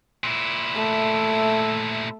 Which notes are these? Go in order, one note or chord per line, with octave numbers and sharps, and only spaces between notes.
A#2 E4
A3